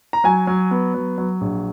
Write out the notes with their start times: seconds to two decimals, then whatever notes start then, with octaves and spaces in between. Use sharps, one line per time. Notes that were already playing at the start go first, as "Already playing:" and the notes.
0.13 A#5
0.24 F#3 G#5
0.47 F#3
0.71 B3
0.94 F#3
1.18 F#3
1.41 A#1